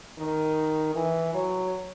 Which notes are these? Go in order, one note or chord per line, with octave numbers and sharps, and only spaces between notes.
D#3
E3
F#3